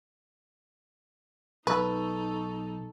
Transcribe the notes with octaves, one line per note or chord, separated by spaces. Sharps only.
B1 D#4 A4 B4 C#6 E6